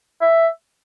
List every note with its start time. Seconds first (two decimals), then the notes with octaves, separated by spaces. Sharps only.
0.21 E5